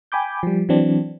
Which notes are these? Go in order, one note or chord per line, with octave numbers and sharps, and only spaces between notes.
G5 G#5 B5 D6 G6
F3 G3
E3 F#3 C4 D4